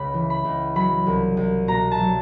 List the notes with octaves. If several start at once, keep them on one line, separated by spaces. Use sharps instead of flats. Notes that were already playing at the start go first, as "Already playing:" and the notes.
Already playing: C#2 C#3 B5
E3
B5
C#2
F#3 B5
C2
C2
B2 A#5
A5
F#3